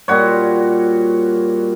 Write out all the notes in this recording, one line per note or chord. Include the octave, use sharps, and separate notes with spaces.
A#2 G3 F#4 C#5